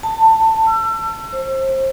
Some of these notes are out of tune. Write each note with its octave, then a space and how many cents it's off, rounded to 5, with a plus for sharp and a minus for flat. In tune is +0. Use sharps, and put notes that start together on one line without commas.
A5 +15
E6 +35
C5 +30